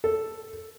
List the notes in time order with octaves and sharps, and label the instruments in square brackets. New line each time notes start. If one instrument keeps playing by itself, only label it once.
[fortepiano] A4